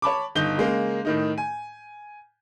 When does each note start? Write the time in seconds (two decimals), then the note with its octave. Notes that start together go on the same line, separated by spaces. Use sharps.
0.02 C#5 A5 B5 D6
0.35 G1 D#4 G6 G7
0.57 C#3 G#3 A#3
1.05 A2 D#3 D#4
1.38 G#5